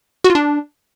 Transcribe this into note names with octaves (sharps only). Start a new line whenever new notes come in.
F#4
F4
D4